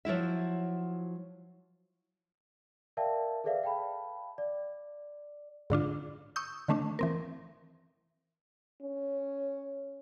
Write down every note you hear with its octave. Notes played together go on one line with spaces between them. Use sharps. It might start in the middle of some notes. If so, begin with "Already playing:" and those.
F3 F#3 E4 E5
A#4 D5 E5 F5 G5 A5
G#4 A4 B4 D5 E5 F5
F5 G5 A5 B5
D5
G#2 D3 D4 F4
C#6 D#6 E6 G6
D3 D#3 A3 C#4 D4
E3 C4 A#4
C#4